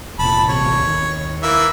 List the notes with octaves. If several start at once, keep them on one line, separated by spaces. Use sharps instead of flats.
F1 A#2 A5 B5
A1 C3 C#5
D#2
E3 A#3 E5